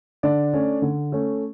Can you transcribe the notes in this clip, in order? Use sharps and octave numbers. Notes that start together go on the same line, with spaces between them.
D3 D4 D5
A3 C#4
D3
A3 C#4